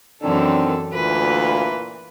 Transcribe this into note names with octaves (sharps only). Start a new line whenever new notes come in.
F#2 D#3 E3 C4 D4 A4
D2 A#2 E3 F4 B4